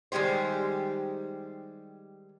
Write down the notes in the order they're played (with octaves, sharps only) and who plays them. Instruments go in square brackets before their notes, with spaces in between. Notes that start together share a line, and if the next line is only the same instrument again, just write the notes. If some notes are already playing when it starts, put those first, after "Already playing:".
[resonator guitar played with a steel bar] D#3 G3 G#3 G4 C5